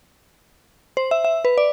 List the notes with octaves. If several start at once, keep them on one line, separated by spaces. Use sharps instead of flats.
C5
E5
E5
B4
D5